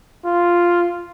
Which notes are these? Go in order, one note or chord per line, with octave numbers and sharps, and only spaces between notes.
F4